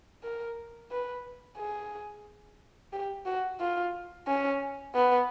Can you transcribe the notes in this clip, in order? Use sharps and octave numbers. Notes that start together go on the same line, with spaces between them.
A#4
B4
G#4
G4
F#4
F4
C#4
B3